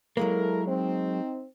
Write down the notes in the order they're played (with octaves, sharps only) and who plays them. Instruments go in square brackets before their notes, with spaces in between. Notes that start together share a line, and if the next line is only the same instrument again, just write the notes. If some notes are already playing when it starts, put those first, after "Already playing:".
[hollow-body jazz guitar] F#3 G#3 A#3 [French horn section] E4 A4 A#4
[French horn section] C4 D#4 C5